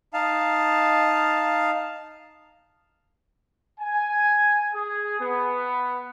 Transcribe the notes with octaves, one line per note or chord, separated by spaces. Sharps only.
D#4 F5 A5
G#5
G#4
B3